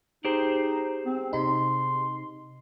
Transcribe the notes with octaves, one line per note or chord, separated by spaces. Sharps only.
D#4 G4 G#4 C5
C4
C3 D#4 C6